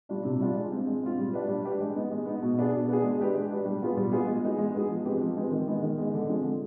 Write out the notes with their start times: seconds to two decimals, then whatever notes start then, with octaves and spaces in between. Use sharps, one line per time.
0.09 G3 D4 F4
0.25 C3
0.40 G3 D4 F4
0.56 G#3
0.72 C4 F4
0.87 G#3
1.03 C4 F4
1.18 G3
1.33 D4 G4 B4
1.48 G3
1.65 D4 G4 B4
1.80 G#3
1.95 B3 D#4
2.11 G#3
2.26 B3 D#4
2.42 B2
2.58 B3 D4 G#4
2.73 B2
2.88 B3 D4 G#4
3.03 G#3
3.19 D4 G4 B4
3.35 G#3
3.51 D4 G4 B4
3.66 G3
3.82 B3 F4 G#4 B4
3.97 G3
4.12 B3 F4 G#4 B4
4.27 G#3
4.44 B3 D#4 G#4
4.58 G#3
4.74 B3 D#4 G#4
4.90 F3
5.05 G#3 C4 G4 B4
5.21 F3
5.37 G#3 C4 G4 B4
5.51 D#3
5.67 G#3 B3 D#4
5.82 D#3
5.98 G#3 B3 D#4
6.14 D3
6.29 F3 G#3 C4
6.44 D3